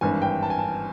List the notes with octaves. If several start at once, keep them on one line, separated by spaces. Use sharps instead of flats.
G#1 G2 E3 G#5
G5
A5
G#5
A5